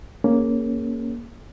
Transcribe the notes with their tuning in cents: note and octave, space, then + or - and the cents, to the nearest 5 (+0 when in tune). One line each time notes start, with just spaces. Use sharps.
A#3 +0 C#4 +0 G#4 +0